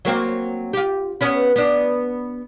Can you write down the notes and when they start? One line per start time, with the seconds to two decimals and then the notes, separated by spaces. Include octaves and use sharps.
0.05 F#3 A#3 C4
0.73 F4 G4
1.21 B3 C#4 B4
1.56 B3 D4